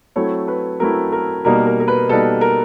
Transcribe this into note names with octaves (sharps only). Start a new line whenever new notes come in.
F#3 A3 C4 E4 C#5
B4
F#3 A3 C4 E4 A#4
A#4
B2 G3 A#3 D#4 A#4
A#4
A#4
B4
B2 G3 A#3 D#4 A4
A#4